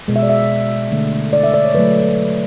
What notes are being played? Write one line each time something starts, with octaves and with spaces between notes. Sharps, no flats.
B2 G#3
E5
D5
E5
D3 A3
D5
E5
D5
C#5
D3 F#3 A3 B4